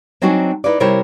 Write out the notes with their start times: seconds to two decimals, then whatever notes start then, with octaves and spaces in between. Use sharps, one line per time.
0.22 F#3 C4 D4 D#4 F#4 G#5
0.64 D#4 E4 B4 D5
0.80 C3 G3 E4 A#4 C5 C#5